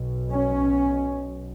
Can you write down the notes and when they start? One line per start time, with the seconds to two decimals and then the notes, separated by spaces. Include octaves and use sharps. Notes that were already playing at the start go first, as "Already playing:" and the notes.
Already playing: B1 B2
0.31 C#4